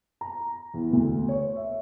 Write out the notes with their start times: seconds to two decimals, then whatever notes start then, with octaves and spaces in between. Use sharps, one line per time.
0.21 A#5
0.74 E2
0.93 D2
1.29 C#5
1.56 E5